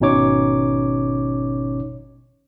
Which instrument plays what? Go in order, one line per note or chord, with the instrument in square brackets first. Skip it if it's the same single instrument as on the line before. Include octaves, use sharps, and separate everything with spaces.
[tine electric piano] G#1 B2 C#4 D#4 C#5 D6